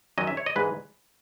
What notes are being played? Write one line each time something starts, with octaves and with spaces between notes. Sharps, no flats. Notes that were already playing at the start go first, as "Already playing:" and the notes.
F#2 D#3 F#3 C#4 D#5
E5
C#5
D#5
G#2 E3 G#3 B4